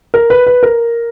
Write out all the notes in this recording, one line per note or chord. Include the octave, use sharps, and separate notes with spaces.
A#4
B4
B4
A#4